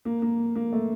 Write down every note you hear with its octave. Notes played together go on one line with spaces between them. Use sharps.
A#3
A#3
A#3
A3